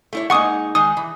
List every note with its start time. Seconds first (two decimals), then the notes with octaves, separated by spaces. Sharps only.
0.13 A3 E4 C#5
0.30 G#3 A#3 D#4 F#5 C#6 D#6
0.75 D#3 G#3 D#4 D#6
0.97 E3